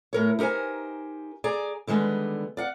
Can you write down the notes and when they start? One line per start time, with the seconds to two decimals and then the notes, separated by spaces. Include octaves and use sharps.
0.13 A2 A#4 C#5
0.39 D#4 G4 A#4 C5 G#5
1.44 G#4 D5 G#5 A#5
1.87 D3 D#3 G3 G#3 B3
2.57 D5 F5 F#5